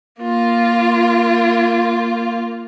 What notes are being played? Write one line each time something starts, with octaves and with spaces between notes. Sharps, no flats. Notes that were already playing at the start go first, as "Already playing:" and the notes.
A#3 F4